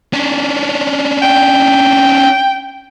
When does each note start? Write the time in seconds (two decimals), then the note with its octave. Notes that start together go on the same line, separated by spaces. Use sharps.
0.13 C#4 D4
1.22 G5